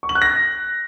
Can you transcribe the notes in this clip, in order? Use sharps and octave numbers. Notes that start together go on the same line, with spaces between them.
C#6
F#7
F#6
A#6